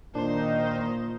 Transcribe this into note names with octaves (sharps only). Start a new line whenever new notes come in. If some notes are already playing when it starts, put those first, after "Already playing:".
A#2 D#3 D4 D#4 C5